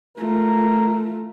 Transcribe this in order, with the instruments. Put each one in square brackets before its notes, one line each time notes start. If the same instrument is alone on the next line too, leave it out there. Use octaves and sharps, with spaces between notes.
[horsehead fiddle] A3 F4 [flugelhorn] A#4